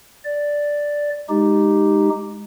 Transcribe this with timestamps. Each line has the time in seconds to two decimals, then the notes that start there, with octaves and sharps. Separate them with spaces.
0.25 D5
1.29 G#3 D#4 G4